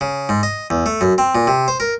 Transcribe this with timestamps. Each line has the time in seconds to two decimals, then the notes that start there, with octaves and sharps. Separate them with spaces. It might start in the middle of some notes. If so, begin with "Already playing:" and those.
0.01 C#3
0.29 G#2
0.43 D#5
0.70 E2
0.86 A3
1.01 F#2
1.18 C4
1.35 A#2
1.47 C3
1.68 C5
1.80 A#4